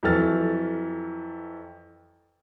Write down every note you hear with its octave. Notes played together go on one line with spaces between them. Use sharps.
F2 E3 F#3 A4 F6 A6